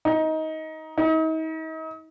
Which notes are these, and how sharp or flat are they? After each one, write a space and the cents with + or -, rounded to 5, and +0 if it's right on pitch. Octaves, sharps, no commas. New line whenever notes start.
D#4 +20
D#4 +40